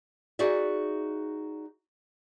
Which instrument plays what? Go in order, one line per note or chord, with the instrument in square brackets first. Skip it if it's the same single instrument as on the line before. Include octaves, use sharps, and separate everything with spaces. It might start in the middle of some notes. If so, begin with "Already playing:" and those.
[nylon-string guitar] D#4 F#4 G#4 D5 E5